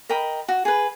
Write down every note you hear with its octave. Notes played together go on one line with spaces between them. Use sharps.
A#4 D#5 G5 B5
F#4
G#4 B4